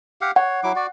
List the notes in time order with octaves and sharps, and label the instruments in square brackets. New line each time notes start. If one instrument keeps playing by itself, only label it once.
[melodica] G4 F5 F#5
[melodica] C#5 [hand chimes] F#5
[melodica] F#3 E4 D6
F#4 D5